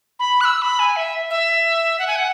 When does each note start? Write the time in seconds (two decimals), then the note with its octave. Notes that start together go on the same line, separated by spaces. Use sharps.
0.19 B5
0.41 F#6
0.45 E6
0.62 B5
0.79 G#5
0.96 E5
1.30 E5
1.99 F#5
2.07 G#5
2.16 F#5